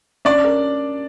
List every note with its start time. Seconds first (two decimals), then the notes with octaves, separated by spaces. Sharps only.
0.25 C#4 D4 D5
0.44 A#4